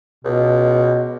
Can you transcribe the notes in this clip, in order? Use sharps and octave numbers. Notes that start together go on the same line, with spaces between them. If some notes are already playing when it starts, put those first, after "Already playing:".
C#2 B2